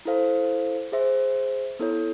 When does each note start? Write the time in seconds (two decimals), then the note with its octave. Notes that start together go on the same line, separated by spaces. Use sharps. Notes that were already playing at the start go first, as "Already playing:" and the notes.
0.05 E4 A4 C5 F5
0.92 G#4 C5 E5
1.79 B3 E4 A4 C#5